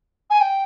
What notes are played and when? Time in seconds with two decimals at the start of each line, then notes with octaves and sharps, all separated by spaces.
0.30 G#5
0.41 G5